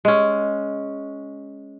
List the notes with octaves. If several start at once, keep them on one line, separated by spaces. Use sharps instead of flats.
G#3 C#4